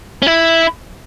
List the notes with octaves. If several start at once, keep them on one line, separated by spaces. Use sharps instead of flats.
C#4
E4